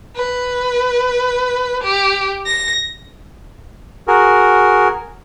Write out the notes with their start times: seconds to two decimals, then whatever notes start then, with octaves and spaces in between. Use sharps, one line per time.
0.16 B4
1.84 G4
2.46 A#6
4.08 F#4 G#4 A#4